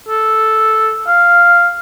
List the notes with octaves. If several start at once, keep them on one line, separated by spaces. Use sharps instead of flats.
A4
F5